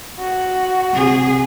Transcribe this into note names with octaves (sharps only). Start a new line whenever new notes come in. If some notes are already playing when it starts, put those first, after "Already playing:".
F#4
C3 G#4